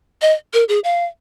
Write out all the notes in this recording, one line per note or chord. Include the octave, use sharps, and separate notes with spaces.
D#5
A#4
G#4
F5